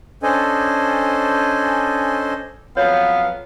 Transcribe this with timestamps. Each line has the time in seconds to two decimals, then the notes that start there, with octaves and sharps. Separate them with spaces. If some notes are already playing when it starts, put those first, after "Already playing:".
0.23 C#4 D4 A4 C5 D#5 G#5
2.77 F2 F#3 B3 C#5 F5